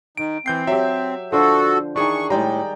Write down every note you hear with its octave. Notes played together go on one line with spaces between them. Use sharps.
D#3 D7
E3 C4 G6 C7
F#3 G4 E5
D3 F3 F#4 A4
D#3 E3 D4 G#4 C#6
A2 G3 G#3 D#4 D5 G5 A#5